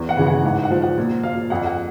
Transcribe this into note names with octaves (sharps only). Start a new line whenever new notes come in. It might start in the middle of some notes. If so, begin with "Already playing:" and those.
Already playing: E2
F#5
C#3 E3
F#5
G#2 F#5
F#5
F3
F#5
A#2
F3 F5
F2 F#5
F#5